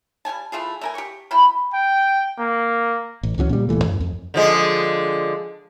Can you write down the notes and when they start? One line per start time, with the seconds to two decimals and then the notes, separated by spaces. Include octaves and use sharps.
0.25 G3 D#4 G#5 A5
0.52 E3 A3 F4 G#4
0.81 A3 A#4 G#5
0.95 G4 C#6
1.31 B2 E4 G5 B5
1.73 G5
2.39 A#3
3.23 A1
3.38 C#2 E3 F#3 C#4
3.49 A#2 G3
3.69 D1 A#2 E3 A3
3.84 F#2
4.00 F2
4.34 D3 F3 G#3